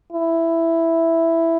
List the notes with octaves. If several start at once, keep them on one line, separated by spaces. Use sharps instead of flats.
E4